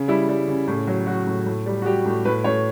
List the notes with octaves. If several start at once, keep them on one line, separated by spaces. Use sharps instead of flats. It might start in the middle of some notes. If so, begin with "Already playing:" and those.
Already playing: C#3
G3 E4
G3
C#3
A2
F#3
F#3 F#4
A2
A2
G3
F#4
G3 G4
A2
A2 B4
A2 C#5